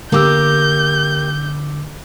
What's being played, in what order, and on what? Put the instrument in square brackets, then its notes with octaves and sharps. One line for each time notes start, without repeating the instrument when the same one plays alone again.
[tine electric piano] D3 D6 E6 [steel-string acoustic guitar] A#3 G4 [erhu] G6